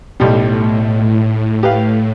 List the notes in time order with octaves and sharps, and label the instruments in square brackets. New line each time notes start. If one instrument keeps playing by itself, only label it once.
[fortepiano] B1 G3 [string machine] A2
[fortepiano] G4 B4 F5